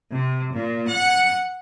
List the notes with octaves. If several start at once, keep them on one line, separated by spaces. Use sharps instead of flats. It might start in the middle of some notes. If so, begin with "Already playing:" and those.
C3
A#2
F#5